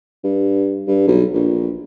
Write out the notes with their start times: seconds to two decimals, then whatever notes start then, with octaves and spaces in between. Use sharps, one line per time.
0.24 G2
0.88 G2
1.08 B1
1.34 A#1